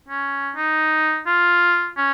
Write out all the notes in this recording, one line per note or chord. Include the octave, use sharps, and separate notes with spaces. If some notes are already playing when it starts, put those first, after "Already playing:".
C#4
D#4
F4
C#4